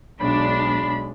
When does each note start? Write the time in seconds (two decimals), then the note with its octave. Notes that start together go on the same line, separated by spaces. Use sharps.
0.20 B1 G#3 D4 B5